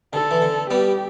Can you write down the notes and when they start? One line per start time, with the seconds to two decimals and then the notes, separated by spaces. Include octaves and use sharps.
0.13 D3 A4
0.31 E3
0.42 D3
0.70 G3 B3 G4